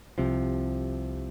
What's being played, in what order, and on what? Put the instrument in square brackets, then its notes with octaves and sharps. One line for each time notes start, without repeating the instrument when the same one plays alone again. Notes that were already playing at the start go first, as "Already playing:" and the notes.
[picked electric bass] C2 C3 F3